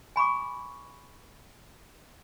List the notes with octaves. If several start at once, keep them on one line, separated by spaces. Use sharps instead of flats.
G#5 B5 C#6 D6